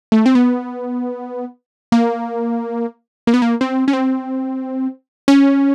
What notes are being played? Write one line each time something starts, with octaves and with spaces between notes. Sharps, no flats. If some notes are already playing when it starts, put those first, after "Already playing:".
A3
C4
B3
A#3
A#3
B3
A#3
C4
C#4
C4
C#4